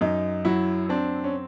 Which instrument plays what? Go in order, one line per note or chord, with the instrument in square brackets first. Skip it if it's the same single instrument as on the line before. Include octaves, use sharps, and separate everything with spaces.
[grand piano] F#2 [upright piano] D#4
[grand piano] F#3 [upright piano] E4
[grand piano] C4 [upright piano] D4
[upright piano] C#4